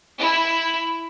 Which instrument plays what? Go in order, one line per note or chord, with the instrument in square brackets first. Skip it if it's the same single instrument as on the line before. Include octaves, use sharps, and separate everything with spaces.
[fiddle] E4